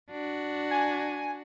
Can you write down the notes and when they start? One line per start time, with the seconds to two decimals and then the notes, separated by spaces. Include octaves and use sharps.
0.11 D4 F#4
0.71 G#5